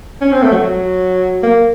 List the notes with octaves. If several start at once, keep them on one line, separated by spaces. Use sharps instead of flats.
C#4
C4
A3
F#3
F#3
A#3